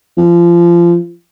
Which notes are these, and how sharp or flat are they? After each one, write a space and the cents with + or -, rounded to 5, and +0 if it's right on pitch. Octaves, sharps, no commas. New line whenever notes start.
F3 -25